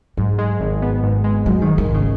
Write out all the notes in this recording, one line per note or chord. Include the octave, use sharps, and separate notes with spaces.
G#2 F#3
G#3
G#1
B3
G#2
G#3
G#2 F#3
D#3
G#3
D#3
G#1
C#3